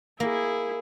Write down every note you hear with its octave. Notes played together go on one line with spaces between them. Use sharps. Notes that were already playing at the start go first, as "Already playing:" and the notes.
A#3 E4 G#4